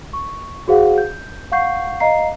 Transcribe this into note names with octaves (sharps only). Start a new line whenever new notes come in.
C#6
F#4 G#4 C5 F5 F#5
G6
F5 F#5 C#6 G6 C7
D#5 F5 A#5 C7